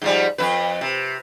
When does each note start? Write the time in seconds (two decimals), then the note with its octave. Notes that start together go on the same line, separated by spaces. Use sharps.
0.02 G#2 F3 G3
0.38 F2 B4
0.81 C3